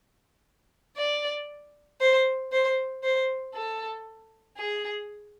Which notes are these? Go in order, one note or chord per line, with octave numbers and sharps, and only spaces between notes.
D5
C5
C5
C5
A4
G#4